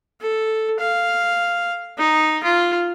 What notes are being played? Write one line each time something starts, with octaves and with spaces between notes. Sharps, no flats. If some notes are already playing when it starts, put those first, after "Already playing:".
A4
F5
D#4
F4